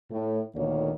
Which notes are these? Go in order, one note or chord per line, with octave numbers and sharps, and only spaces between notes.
A2
D2 A#2 D3 D#3 A#3 C#5